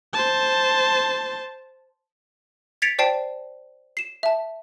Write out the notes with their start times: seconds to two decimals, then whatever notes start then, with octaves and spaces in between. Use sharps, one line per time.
0.13 C5 A5
2.82 G#6 A6 B6 C#7 D7 F7
2.99 C5 D5 G5 A5 C7
3.97 C7 E7
4.23 E5 A5